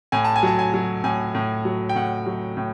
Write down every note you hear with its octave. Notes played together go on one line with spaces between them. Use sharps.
A2 G#5
A5
G#5
F#3 A5
G#5
F#3
A2 G#5
A2
F#3
G5
A2 F#5
F#3
A2